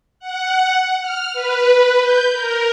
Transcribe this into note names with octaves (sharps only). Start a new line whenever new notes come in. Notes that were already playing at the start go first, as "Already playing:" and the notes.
F#5
F6
B4
G6
A#4